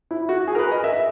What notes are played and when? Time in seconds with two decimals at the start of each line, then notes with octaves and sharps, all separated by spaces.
0.11 E4
0.29 F#4
0.47 G#4
0.55 A#4
0.59 B4
0.72 D#5
0.84 E5